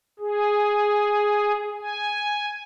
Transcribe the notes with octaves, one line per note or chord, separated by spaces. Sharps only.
G#4
G#5